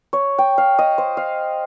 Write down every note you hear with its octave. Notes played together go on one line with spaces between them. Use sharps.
C#5
G5
F5
D#5
C5
F5